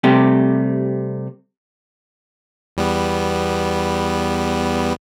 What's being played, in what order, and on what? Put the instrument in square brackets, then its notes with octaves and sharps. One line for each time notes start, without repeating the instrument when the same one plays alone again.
[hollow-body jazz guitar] C3 G3 A3 G4
[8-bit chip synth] E2 G3 B3